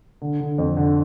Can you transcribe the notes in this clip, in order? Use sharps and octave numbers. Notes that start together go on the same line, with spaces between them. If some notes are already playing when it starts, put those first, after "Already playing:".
D3
D3
F2
D3